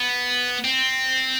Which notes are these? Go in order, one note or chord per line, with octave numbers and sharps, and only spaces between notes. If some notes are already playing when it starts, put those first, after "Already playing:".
Already playing: B3
C4